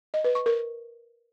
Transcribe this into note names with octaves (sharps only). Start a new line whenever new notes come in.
D#5
B4
C#6
A#4